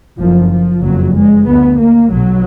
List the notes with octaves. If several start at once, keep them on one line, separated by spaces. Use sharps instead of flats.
F#1 F#2 F3
F3
F#1 F2 F#3
G#3
D2 B3
A#3
B1 B2 F#3